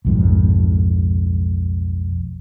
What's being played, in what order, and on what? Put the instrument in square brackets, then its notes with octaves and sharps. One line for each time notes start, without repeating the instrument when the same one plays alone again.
[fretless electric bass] B1 F2 G#2